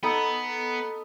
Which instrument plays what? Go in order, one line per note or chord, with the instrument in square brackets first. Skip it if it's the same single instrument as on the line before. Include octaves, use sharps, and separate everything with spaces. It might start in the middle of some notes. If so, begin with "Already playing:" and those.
[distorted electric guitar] B3 [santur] D#4 A4 B5